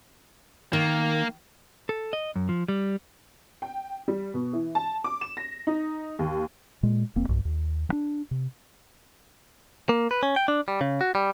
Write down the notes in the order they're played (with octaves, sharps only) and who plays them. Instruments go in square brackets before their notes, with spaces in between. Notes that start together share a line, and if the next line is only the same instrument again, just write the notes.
[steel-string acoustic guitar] D#3 [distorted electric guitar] A#3
[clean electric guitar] A4
D#5
F#2
F3
G3
[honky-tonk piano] G5
G3
B2
E3
A5
D6
E7
A#6
D#4
D#2
[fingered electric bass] A#2 G#3
E1 A#3 C4
B1 G2
D#2
E3 D4
C3
[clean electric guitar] A#3
B4
C#4
G5
D4
G3
C#3
F#4
G3